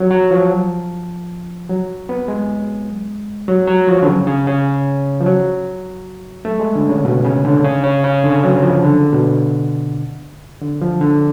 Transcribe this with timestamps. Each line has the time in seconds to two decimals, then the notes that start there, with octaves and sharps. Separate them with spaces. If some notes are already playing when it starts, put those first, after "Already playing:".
Already playing: F3 F#3
0.10 F#3
0.31 F3
1.69 F#3
2.09 B3
2.28 G#3
3.48 F#3
3.67 F#3
3.87 F3
4.02 D3
4.07 C#3
4.27 C#3
4.47 C#3
5.21 F3
5.26 F#3
6.45 A3
6.60 G#3
6.75 D3
6.89 C#3
7.05 B2
7.24 C#3
7.45 D3
7.64 C#3
7.84 C#3
8.04 C#3
8.24 D3
8.44 F#3
8.63 F3
8.83 D3
9.13 B2
10.61 D3
10.82 F3
11.01 D3